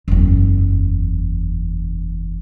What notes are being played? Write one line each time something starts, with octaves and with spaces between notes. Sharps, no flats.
F#1 E2